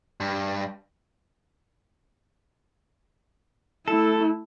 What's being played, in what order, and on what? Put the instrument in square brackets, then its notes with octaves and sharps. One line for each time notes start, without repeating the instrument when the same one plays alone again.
[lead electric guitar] G2
[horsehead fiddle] A3 E4 [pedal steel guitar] A4